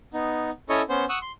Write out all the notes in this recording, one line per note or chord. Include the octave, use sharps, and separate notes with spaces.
B3 D#4
C#4 E4 A4 C#5 D#5 C#6
B3 C#4 C5
F#5 C#6 D#6 E6
C6